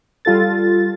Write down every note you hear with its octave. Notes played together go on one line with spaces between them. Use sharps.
G3 F4 A4 A6